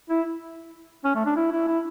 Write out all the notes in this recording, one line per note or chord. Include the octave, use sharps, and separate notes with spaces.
E4
C#4
A3
D4
E4
E4
E4